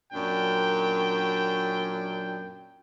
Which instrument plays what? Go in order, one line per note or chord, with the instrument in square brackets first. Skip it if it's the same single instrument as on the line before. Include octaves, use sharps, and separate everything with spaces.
[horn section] F#2 A#2 D4 G5